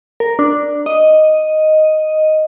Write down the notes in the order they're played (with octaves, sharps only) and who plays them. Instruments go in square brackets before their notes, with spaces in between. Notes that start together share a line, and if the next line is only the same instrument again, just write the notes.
[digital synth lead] A#4
D4
D#5